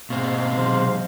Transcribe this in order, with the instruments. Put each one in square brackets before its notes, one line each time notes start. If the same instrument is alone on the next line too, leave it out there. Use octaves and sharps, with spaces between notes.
[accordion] G#2 G#3 F5 [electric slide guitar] B2 C4 [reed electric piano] A#3
[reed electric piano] C3 E3 F#3 [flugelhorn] C5